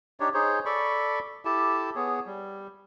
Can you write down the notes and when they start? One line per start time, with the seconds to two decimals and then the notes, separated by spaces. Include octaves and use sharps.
0.20 D4 D#4 G4 C#5
0.34 D#4 G#4 C5 C#5
0.66 A4 D5 B5 C#6
1.45 E4 G4 A4 A5
1.96 B3 G#4 C#5
2.26 G3